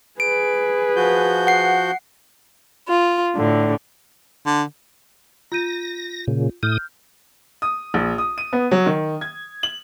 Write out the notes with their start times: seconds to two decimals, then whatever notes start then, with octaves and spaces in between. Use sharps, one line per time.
0.20 G#4 B4 D7
0.96 F3 F#4 G6
1.47 F#5 C7
2.89 F4
3.36 A2 D3
4.46 D3
5.52 F4 G6 A#6 D#7
6.28 A#2 C#3
6.63 A2 D#6 F6 G6
7.62 D#6
7.94 A#1
8.18 D#6
8.38 D#7
8.53 B3
8.71 F#3
8.86 D#3
9.21 G#6
9.63 F#7